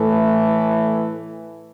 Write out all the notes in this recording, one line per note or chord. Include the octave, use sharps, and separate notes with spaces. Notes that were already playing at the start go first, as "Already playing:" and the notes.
Already playing: A2 E3 A3